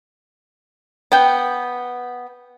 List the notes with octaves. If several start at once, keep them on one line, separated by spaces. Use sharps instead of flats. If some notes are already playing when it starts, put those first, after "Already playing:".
B3 G5